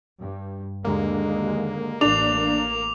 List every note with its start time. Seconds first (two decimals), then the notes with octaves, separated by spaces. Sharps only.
0.19 G2
0.85 D#2 D3 G#3 A#3
2.01 A1 D4 D6 F7